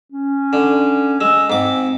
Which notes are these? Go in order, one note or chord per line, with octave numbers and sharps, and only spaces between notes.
C#4
D3
G#3 E6
G#2 C4 D6